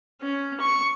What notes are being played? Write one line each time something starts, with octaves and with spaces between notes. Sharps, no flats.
C#4
C#6